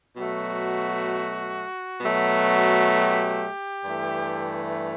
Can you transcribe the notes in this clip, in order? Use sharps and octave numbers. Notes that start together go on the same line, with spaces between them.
B2 F#3 A3 F#4
B2 F#3 A3
G4
G2 E3 A3